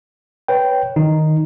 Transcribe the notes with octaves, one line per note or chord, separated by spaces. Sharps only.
B4 C#5 G5
D#3 D#4